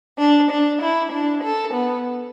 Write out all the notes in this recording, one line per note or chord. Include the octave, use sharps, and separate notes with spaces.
D4
D4
E4
D4
A4
B3